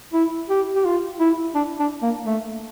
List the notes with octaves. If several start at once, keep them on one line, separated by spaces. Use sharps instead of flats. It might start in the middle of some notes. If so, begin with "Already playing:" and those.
E4
G4
G4
F4
E4
D4
D4
A#3
A3